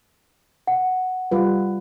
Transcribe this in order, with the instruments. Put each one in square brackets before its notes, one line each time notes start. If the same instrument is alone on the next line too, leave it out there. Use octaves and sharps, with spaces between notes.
[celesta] F#5
[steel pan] G3 F4 B4